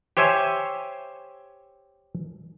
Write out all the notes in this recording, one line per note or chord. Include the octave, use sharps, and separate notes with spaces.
G4 C5 C#5 E5 G#5